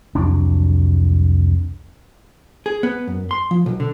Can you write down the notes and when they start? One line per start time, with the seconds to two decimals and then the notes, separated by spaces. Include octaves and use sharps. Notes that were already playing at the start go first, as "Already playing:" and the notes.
0.15 C2 F2 F#3 D4
2.66 G#4
2.83 B3
3.08 F#2
3.31 C6
3.51 F3
3.66 B1
3.80 D3